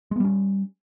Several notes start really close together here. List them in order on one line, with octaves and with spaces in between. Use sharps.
G#3 B3 G3 C#4